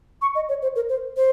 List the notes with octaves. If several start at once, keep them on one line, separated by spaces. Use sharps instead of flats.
C#6
D#5
C#5
C5
A#4
C5
C5